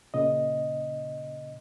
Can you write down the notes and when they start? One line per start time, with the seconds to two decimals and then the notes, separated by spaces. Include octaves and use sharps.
0.14 A#2 C#3 D#5